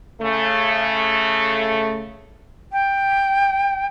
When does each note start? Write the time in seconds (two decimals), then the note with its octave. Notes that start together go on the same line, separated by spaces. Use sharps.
0.21 C#3 A3
2.72 G5